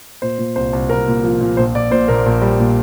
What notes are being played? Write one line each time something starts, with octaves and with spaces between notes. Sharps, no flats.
A#2 C5
A#2
C2 C5
C2
C2 A#4
A#2
F3
A#2
A#1 C5
A#1 D5
A#2 C5
A#1 A#4
A#1
G3
A#2